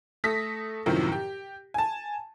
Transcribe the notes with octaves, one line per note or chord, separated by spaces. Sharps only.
A3 A4 D#6 A#6 B6
F#2 A2 C3 D#3 F3
G4
G#5 A5